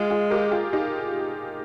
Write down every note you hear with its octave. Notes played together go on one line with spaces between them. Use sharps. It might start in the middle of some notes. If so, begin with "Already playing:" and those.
Already playing: G#3 F4 G#4
F4 G#4
G4 A#4
F4 G#4
D#4 G4